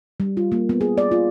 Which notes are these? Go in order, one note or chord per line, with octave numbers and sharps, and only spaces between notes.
G3
F4
A#3
B3
G#4
D5
F4